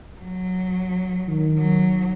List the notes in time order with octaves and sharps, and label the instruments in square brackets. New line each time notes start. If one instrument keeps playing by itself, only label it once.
[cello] F#3
[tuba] D#3
[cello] F#3